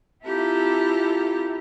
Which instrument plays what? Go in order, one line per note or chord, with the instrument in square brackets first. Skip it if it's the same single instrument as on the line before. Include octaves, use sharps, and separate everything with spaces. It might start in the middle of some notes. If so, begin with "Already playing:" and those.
[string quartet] C4 E4 F4 G4 A4 A#5